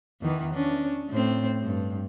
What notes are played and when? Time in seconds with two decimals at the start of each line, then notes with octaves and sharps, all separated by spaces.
0.21 E2 D#3 E3
0.54 C#4 D4
1.09 A2 C4
1.62 G2